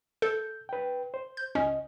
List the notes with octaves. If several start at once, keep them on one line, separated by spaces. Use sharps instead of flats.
A4 G6
B4 G5
C5
G6
C#2 C#4 D#5